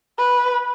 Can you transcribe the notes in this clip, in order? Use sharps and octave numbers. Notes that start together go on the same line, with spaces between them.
B4